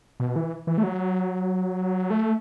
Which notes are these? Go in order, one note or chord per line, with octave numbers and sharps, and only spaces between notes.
B2
E3
E3
A3
F#3
A3